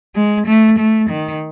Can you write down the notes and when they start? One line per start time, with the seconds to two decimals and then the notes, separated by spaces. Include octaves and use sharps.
0.16 G#3
0.47 A3
0.79 A3
1.10 D#3